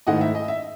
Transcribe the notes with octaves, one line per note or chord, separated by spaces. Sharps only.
G#2 D#3 A3 E4 D#5 F#5
E5
D#5
E5